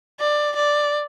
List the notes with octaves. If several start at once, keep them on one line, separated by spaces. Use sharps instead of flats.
D5
D5